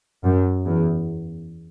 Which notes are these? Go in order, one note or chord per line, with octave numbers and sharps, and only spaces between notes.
F#2
E2